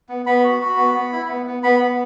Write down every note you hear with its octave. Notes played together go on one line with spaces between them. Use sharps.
B3
B3 B5
F#4
F#4
B3
B3
E4
B3
B3
B3 B5
B3